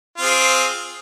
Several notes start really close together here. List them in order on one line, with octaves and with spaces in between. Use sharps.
F4 C4 G#4